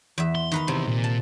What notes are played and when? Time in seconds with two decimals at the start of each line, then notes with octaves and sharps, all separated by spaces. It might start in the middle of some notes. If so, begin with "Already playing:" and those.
0.18 E2 E5
0.35 C6
0.52 D#3 B4 A#5
0.68 C3 E3 B3
0.87 A#2
1.04 A5